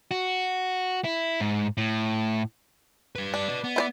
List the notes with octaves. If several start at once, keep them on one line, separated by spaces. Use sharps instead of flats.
F#4
E4
G#2
A2
G3 B4
D4
B4 D#5
B3
E4 C5 D5